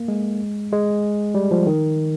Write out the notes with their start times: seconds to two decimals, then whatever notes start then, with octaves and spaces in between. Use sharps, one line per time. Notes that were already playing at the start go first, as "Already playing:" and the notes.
Already playing: A#3
0.08 G#3
0.73 G#3
1.35 G3
1.51 F3
1.67 D#3